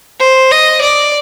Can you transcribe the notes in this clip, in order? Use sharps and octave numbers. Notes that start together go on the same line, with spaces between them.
C5
D#5
D5